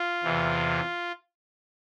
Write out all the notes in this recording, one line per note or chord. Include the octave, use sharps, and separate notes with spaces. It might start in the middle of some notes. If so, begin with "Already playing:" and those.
Already playing: F4
E2 C3 E3